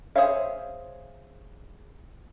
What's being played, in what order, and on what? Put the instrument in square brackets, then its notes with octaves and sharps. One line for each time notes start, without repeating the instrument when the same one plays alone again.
[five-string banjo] G#4 C5 C#5 E5 F5